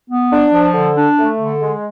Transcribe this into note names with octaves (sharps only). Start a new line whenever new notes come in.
B3
D4
F3
D3
D4
A3
D3
G#3